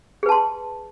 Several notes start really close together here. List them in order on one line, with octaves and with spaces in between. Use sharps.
G#4 B4 A5 C6